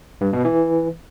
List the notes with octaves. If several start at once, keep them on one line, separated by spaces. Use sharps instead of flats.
G2
B2
E3